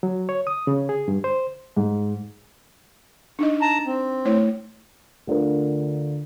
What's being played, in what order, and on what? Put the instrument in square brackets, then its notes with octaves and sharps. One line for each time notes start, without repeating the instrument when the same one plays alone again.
[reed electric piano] F#3
C#5
D#6
C#3
G#4
G2
C5
[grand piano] G#2
[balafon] D4 D#4 D#5
[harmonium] A5 A#5
C4
[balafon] A3 E4 C#5
[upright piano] D2 D3 F4 A#4